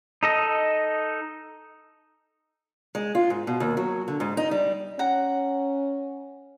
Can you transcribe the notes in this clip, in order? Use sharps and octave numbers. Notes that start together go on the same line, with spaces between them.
D#4 A4 D#5
G#3
F4
G#2
B2
D#2
F#3
D3
G#2
D#4
G3
C#4 F#5 A#5